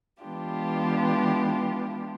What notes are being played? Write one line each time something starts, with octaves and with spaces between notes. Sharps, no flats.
E3 G#3 B3 D4 F4 G4